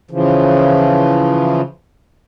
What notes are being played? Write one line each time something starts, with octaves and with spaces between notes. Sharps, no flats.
C#3 E3 F3